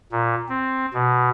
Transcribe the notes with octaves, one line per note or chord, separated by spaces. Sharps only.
A#2
C4
B2